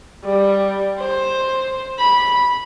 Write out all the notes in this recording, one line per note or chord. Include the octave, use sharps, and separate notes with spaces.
G3
C5
B5